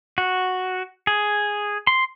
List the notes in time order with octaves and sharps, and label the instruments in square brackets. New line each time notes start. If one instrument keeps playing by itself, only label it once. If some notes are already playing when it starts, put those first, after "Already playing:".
[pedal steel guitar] F#4
G#4
C6